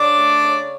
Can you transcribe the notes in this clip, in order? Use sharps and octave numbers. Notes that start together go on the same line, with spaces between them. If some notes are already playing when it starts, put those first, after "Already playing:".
Already playing: C#3 D4 D5
A3
C#3